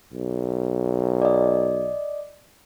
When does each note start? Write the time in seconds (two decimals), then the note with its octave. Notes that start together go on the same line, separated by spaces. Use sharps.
0.13 B1
1.22 D5 D#5